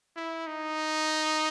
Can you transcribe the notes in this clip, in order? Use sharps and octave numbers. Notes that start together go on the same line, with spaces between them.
E4
D#4